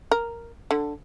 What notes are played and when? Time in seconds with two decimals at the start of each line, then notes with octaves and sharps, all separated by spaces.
0.11 A#4
0.71 D3